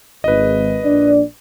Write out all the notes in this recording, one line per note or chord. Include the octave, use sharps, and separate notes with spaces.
G#1 B4 D#5
A#1 D4 D5